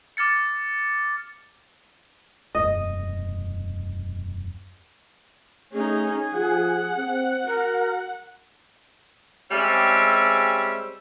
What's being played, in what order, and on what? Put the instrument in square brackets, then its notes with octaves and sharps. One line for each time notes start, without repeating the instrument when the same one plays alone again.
[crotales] D6 F6 A6 C#7
[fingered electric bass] E1 F#2 [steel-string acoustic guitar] D#5 [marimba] D#6
[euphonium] A3 [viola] C#4 D#4 [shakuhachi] G#4
[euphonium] F3 [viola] F#5
[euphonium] C4
[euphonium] F#4 [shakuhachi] A#4
[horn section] G3 G#3 C4 C#4 G4 E5